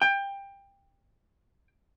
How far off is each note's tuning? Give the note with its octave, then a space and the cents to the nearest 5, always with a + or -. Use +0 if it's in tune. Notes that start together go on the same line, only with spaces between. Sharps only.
G5 +20